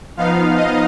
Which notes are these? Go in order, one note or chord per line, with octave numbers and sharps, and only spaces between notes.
F3 B3 D#4 F5
D#5